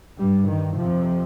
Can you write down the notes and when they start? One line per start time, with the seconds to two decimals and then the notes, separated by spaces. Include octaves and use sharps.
0.19 G2 G3
0.48 D#3
0.76 F2 C3 F3